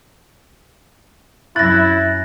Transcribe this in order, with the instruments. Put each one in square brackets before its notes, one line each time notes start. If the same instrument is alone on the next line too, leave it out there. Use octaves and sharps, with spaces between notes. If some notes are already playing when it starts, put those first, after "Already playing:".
[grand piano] F#2 F#6 [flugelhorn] E4 [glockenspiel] A6 A#6